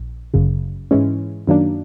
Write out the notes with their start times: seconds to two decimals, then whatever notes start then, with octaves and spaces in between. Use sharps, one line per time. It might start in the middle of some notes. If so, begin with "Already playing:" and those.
Already playing: A#1
0.34 G1 F#2 C#3
0.91 G#2 E3 G#3 C#4
1.47 F#2 D#3 F#3 A#3 D4